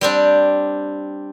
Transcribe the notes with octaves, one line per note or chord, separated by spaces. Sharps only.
G3 C4 D4